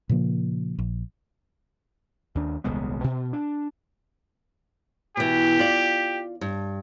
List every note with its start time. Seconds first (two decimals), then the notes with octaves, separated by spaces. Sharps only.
0.09 A#2 C#3 F3 A#3
0.79 A#1
2.35 D#2 D4
2.64 D#1 C2 G#3 B3
3.04 B2
3.33 D4
5.17 B2 E3 G4
5.59 F4 D5
6.41 G2